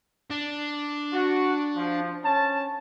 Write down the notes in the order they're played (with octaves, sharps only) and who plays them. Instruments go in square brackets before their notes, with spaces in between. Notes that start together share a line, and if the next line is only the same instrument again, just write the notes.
[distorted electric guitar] D4
[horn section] F#4
F3
C#4 A5